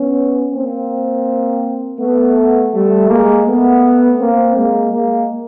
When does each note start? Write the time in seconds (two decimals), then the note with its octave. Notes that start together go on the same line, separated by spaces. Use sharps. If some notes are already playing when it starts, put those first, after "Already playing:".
Already playing: B3 C#4
0.52 A#3 C4
1.98 A3 B3
2.73 G3 A3
3.09 G#3 A#3
3.46 A3 B3
4.20 A#3 C4
4.56 G#3 A#3
4.93 G#3 A#3